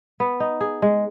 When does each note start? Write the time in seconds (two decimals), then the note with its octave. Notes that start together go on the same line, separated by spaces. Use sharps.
0.20 B3
0.40 D#4
0.61 G#4
0.82 G#3